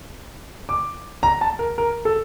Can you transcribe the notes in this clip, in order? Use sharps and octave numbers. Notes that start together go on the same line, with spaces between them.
D6
A#5
A5
A#4
A#4
A4